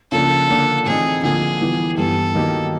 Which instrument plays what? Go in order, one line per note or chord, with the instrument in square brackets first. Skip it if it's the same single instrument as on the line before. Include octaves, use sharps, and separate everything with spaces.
[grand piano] C#3 F3 A#3 D4 [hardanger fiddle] A4
[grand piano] D3 F3 A#3 D4
[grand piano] A2 E3 A3 C4 D#4 [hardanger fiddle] G#4
[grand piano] D3 F3 A#3 [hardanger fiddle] G#4
[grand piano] E3 G3 B3 E4 G4
[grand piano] G2 E3 G3 B3 [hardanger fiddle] A4
[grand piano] D#3 F#3 A#3 D#4 G4